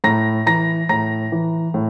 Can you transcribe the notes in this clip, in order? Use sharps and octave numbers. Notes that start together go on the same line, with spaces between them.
A2 A#5 A#6
E3 A#5 A#6
A2 A#5 A#6
E3
A2